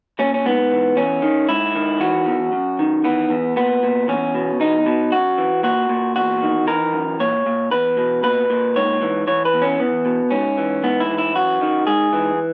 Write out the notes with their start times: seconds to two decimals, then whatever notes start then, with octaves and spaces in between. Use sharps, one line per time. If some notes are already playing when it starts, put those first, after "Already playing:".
0.19 A#2 C#4
0.34 C#4
0.46 G#2 B3
0.72 E3
0.96 E2 C#4
1.22 D#3
1.49 G#2 E4
1.75 D#3
2.00 E3 F#4
2.26 E2
2.52 F#2
2.79 D#3
3.04 E3 B3
3.30 E2
3.56 A#2 B3
3.83 A#2
4.08 E2 C#4
4.35 B2
4.60 E2 D#4
4.86 B2
5.12 F#2 F#4
5.38 E3
5.63 A#2 F#4
5.89 A#2
6.16 E2 F#4
6.42 D#3
6.67 E3 A#4
6.93 F#2
7.20 A#2 C#5
7.46 A#2
7.71 E2 B4
7.97 B2
8.23 A#2 B4
8.50 A#2
8.76 G#2 C#5
9.01 E3
9.27 E3 C#5
9.45 B4
9.54 E2
9.62 C#4
9.80 E2 B3
10.05 B2
10.31 G#2 C#4
10.58 E3
10.83 G#2 B3
11.00 E4
11.09 E3
11.18 E4
11.35 F#2 F#4
11.61 D#3
11.87 G#2 G#4
12.13 E3